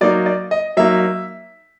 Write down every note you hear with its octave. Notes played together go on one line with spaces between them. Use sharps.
F#3 A#3 D#4 D5
D5
D#5
F#3 A#3 D#4 E5